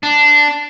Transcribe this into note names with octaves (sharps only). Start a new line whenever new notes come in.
D4